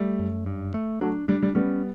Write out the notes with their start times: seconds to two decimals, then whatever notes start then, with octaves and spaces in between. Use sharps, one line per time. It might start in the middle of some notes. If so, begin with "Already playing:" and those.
Already playing: G3 A3
0.19 F#2
0.46 G2
0.74 A3
1.01 F#3 A3 D4
1.28 G3 D4
1.43 G3
1.55 G3 B3 C#4